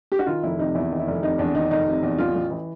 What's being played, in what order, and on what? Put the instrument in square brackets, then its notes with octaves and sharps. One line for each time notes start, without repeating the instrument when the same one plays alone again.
[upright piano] G4
F#4
D#3 F4
F1 E4
C3 D#4
E2 E4
D#3
E4
F1
C3 D#4
E2 D4
D#3 D#4
F1 D#4
C3
E2
A1 F4
A1
E3